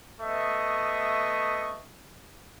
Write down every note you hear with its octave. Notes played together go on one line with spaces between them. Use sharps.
A3 B3 D#5 E5 C#6 D#6